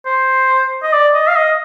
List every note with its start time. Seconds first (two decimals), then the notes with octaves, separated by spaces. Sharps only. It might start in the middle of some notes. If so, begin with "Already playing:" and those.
0.06 C5
0.83 D#5
0.93 D5
1.15 D#5
1.28 F5
1.36 D#5